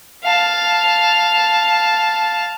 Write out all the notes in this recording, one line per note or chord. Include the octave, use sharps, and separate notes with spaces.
F5 A5